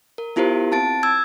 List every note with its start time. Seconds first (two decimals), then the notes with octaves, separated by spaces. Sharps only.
0.18 A#4
0.36 B3 E4 F4 G4 A#4 C5
0.72 C4 A5 A6 D7
1.03 E6 G#6